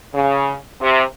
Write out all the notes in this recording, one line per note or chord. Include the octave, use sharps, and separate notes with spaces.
C#3
C3